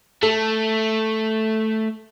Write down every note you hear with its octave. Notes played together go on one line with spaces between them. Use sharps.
A3 A4